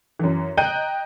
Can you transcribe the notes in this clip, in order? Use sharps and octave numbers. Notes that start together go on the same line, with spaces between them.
F#2 E3
D#5 G5 A#5 F#6 G6 D#7